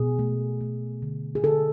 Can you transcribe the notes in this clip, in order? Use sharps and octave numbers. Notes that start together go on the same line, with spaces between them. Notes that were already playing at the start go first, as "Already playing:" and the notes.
Already playing: B2 G#4
A3
A3
D3
G#4
D3 A4